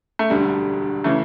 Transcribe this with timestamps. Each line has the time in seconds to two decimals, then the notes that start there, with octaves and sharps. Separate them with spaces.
0.19 A3
0.30 E1 D2 D3 G3
1.04 C#3 E3 A3